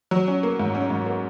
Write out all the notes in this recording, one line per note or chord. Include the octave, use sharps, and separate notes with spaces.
F#3
C#4
A#3
G#2
C#4
G#2
A#3